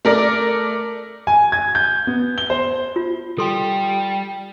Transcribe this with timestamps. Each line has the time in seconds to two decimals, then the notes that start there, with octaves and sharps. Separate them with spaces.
0.05 A3 A#4 D5
1.27 G#5
1.52 G#6
1.75 G6
2.07 B3
2.38 G7
2.50 C5
2.96 F4
3.38 G3 G4 A4 C6